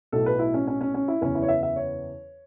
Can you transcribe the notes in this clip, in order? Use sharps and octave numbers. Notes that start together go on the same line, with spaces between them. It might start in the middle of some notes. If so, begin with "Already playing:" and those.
B1 A2 A3 A4
B4
E4
C#4
C#4
C#4
C#4
E4
F#1 E2 E3 B3 C#4
E4
C#5
E5
E5
C#5